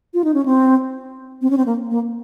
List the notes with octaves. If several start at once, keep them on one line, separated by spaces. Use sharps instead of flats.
F4
D#4
C#4
C4
C4
C#4
C4
A#3
A#3